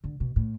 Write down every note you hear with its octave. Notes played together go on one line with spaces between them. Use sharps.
D3
B2
A2